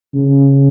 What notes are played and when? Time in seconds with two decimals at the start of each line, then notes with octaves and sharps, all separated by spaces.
0.14 C#3